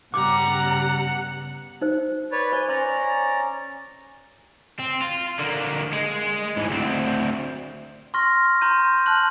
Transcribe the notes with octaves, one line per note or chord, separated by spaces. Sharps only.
G2 C#3 G3 B3 F#5 A#5 D6
D#4 C5
B4 C#5 D5
C5 G#5 G6
C#4 D5 A#5 C6
C4
F4
D3 A#3
G#3
G#2 E3
D2 C4
C6 C#6 F6 A#6
A#5 C6 G6 D#7
A5 F6 F#6 F#7